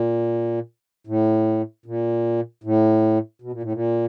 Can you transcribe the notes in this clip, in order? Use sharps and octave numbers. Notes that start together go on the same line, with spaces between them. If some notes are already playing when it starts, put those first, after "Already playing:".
Already playing: A#2
A2
A#2
A2
B2
A#2
A2
A#2